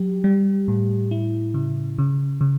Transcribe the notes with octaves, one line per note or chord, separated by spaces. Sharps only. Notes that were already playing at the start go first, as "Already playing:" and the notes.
Already playing: F#3 G4
G3
A2
E4
C#3
C#3
C#3